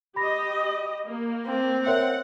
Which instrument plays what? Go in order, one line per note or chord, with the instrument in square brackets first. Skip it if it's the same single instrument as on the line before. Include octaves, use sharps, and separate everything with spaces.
[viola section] G4 D#5 [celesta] B5 A#6
[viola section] A#3
[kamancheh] C4
[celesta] A#4 C#5 E5 [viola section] F#5